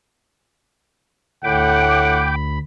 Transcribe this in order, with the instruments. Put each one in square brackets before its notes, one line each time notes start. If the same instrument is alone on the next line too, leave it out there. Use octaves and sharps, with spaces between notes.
[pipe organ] D2 B5 [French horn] A2 [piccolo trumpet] F#5 [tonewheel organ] G5 D6